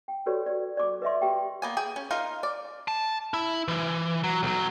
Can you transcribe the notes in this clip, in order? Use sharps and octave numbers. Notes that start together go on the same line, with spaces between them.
G5
F#4 G4 A4 B4 C#5 D5
D5
D5 D6
B4 D#5 E5 C6
G4 G5
A#3 B3 G#5
G#4 G5
C#4
D#4 F4 A#4 F5
D5
A5
E4
E3
F#3
B1 F#3